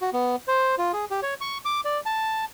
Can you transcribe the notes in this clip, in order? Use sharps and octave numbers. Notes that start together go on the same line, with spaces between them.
F#4
B3
C5
F4
G#4
G4
C#5
C#6
D6
D5
A5